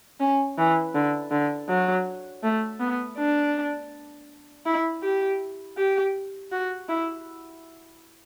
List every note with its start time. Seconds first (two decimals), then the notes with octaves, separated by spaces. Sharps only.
0.20 C#4
0.58 E3
0.95 D3
1.31 D3
1.69 F#3
2.43 A3
2.80 B3
3.18 D4
4.66 E4
5.03 G4
5.78 G4
6.52 F#4
6.89 E4